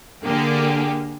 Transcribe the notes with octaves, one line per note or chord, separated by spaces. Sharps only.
D3 A#3 G4 G#4